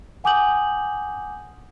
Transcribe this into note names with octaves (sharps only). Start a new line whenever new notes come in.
F#5 G#5 D6 D#6 G6 F#7